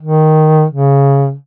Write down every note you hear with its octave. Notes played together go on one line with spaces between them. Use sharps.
D#3
C#3